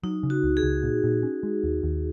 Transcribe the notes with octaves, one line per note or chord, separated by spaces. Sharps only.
F#3 D#4
C#3
F#4
C#2
G#4
C#2
A#2
A#2
C#4
G#3
D#2
D#2